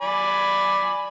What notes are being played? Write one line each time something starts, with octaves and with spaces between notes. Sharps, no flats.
D5 G#5 B5